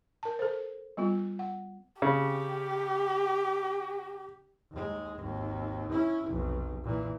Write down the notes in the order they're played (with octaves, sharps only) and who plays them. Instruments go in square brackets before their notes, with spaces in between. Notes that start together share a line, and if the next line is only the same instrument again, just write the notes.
[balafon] A#4 A5
A4 C5
G3 B3 F4
F#5
[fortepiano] C#3 [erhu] G4
[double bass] D#2 G#3
G#1 D#2
C#4 E4
F1 B1
A#2 E3